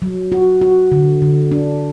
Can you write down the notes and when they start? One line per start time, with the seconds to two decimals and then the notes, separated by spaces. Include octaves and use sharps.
0.02 F#3
0.32 F#4
0.61 F#4
0.92 D3
1.22 D3
1.52 D4